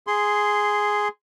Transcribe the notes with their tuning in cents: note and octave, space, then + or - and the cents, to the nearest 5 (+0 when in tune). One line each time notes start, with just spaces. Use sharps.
G#4 +0 C6 -5